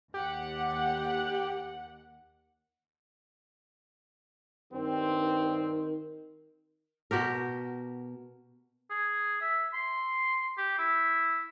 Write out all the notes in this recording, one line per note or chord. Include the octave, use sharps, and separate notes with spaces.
D#2 G4 F#5
G2 D#3 C4
B2 F#4 G4 A#4
G#4
E5
C6
G4
E4